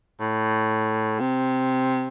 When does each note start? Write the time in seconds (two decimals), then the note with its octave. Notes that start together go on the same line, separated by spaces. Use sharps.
0.20 A2
1.20 C3